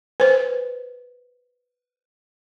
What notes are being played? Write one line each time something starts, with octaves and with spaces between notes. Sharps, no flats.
B4 C5